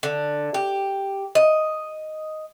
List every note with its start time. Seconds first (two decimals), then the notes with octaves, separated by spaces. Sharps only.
0.03 D3
0.54 G4
1.35 D#5